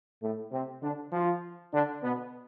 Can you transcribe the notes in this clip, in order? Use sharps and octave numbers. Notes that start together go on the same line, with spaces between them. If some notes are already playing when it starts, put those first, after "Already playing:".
A2 A3
C3 C4
D3 D4
F3 F4
D3 D4
B2 B3